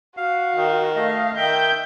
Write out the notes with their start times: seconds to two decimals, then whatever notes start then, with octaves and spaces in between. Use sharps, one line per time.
0.17 F#4 F5
0.56 D#3
0.96 A3 D#5 F5
1.37 D#3 E5 G5 G6